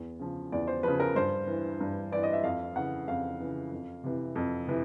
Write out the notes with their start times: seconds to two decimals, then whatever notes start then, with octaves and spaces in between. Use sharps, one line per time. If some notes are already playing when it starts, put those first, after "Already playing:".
Already playing: E2
0.19 C#3 F3
0.52 E2 D5
0.67 C5
0.83 C#3 F3 B4
1.00 A#4
1.15 G2 C5
1.47 E3
1.80 G2
2.12 E3 D5
2.23 D#5
2.33 E5
2.43 F2 F5
2.76 C#3 E3 F#5
3.08 F2 F5
3.40 C#3 E3
3.72 F2
4.04 C3 E3
4.35 F2
4.67 C3 E3